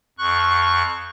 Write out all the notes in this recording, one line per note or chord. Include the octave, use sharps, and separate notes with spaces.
F2 C#6 F#6